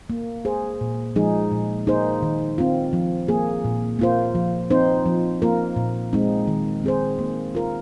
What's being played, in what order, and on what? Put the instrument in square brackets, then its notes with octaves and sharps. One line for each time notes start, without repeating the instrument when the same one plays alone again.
[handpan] A#3
G#4 C5
A#2
F3 G#3 D#4 G#4
A#2
A#3 D#4 G#4 C5
D#3
C4 F4
F3
A#3 G#4
A#2
A#3 F4 C5
F3
C4 D#4 C5
F3
A#3 F4 A#4
A#2
G#3 C4 D#4
D#3
C4 G#4 C5
A#3
F4 A#4